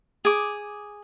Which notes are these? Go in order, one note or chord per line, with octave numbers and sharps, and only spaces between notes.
G#4 D6